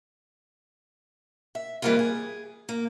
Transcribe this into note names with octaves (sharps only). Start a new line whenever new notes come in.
E5
E3 G3 G#3 A#3 C4 F4
G#4
A#3